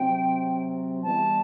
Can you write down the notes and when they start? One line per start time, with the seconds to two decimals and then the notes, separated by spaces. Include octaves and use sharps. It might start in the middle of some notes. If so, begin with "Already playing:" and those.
Already playing: C3 F#3 C4 G5
1.03 E3 G3 B3 A5